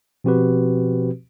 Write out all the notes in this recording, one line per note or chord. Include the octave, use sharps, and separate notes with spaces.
B2 F3 C4 F#4 G4 B4